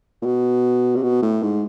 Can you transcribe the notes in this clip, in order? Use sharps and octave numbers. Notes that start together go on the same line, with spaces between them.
A#2
B2
C3
B2
A2
G#2